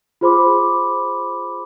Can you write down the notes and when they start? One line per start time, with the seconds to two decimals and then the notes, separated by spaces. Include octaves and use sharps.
0.21 F4 G#4 C5 B5 C6 D6